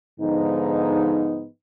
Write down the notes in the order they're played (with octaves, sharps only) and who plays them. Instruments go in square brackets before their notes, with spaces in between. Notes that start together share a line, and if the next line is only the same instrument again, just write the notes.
[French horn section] G#2 D3 F3 B3 D#4